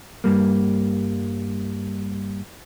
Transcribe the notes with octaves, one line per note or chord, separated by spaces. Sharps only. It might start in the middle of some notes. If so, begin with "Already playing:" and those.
G2 G3 A#3